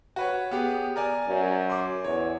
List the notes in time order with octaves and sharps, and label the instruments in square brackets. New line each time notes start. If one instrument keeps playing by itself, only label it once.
[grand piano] F#4 B4 C#5
B3 G4 G#4
A#4 D5 G#5
[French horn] F#2
[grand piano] C6 D6
[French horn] E2 [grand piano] C#5